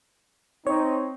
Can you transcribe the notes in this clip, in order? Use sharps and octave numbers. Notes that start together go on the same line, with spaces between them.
C4 D#4 C#5